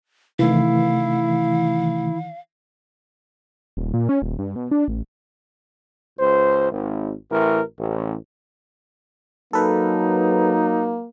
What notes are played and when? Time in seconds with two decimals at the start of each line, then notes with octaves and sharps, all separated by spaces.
0.39 C3 D#3 E3 A3 E4 F5
3.77 D#1
3.94 A#2
4.09 C#4
4.22 D#1
4.39 G2
4.56 B2
4.71 D4
4.88 A1
6.20 C#2 C5
6.72 G#1
7.31 A1 A2 E3 A#4
7.78 A1
9.53 F#3 A#3 D#4 A4 B4